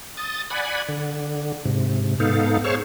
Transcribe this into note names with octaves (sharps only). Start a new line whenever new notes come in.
D#6 A6
D5 F#5 G#5 B5
D3
G#2 C3
G#2 B3 D#4 A4 F5
G#4 C5 C#5 C#6 E6 F6